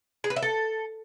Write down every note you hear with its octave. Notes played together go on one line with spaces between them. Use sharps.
G#4
B4
E5
A4